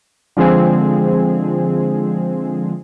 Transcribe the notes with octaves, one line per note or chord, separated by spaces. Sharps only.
D3 F3 G#3 C4 G#4